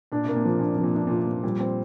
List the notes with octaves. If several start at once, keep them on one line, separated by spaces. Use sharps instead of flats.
A#2 D4
C3 A#3
A#2
C3 F3
A#2 D4
C3
F3
A#2
C3 D4
A#2 F4
F3
A#2 G3
C4